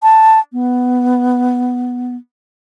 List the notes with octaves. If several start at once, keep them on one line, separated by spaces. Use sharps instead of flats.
A5
B3